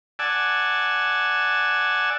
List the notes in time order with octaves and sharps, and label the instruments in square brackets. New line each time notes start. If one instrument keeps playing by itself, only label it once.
[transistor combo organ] D5 F#5 G#5 A5 E6